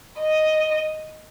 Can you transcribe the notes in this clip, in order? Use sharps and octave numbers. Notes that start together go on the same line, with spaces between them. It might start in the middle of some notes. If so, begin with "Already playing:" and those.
D#5